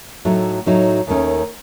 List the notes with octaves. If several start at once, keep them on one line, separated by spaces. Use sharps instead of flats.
A2 F#3 A3 D#4
A2 F#3 A3 D#4
D#2 D#3 A3 C#4